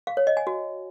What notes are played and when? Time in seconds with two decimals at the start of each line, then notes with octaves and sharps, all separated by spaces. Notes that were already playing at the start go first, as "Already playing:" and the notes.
0.07 F5
0.17 C#5
0.27 D#5
0.37 G#5
0.47 F#4